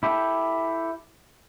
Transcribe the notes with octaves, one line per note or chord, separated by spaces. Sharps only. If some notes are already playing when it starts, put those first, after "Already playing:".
E4 G4 A4